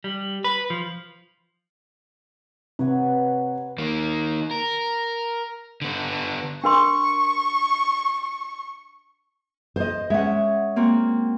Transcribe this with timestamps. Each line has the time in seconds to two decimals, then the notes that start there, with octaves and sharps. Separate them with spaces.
0.04 G3
0.44 B4
0.70 F3
2.79 C3 B4 C#5 F#5
3.78 D#3 A#3
4.51 A#4
5.82 D3 B3
6.64 D4 A#4 C6 C#6
9.76 C5 D#5
10.10 G#3 C#4 E5 F#5
10.76 A#3 C4 F#4